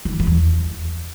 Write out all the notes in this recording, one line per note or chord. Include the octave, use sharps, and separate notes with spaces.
D#3
F#2
E3
E2